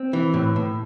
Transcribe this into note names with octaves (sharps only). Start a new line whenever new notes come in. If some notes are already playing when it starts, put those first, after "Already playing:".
Already playing: C4
E3
A2
A2